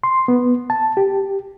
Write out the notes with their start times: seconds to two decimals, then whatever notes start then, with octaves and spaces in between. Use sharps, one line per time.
0.04 C6
0.28 B3
0.70 A5
0.97 G4